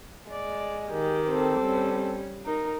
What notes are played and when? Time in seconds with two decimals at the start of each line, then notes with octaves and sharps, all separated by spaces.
0.31 G#3 D5
0.87 D#3 G4
1.29 C4 A4
1.60 G3 C#4
2.46 D#4 A#4